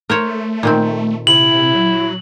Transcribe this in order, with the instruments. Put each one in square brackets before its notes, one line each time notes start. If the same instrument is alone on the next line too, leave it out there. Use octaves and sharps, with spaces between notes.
[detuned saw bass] A3 [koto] A#4 C5 C#5
[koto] A#2 D#3 C4
[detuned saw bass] C3 [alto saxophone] E4 [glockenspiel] F#7
[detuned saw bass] F#3